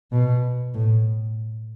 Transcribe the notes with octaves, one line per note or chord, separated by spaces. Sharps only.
B2
A2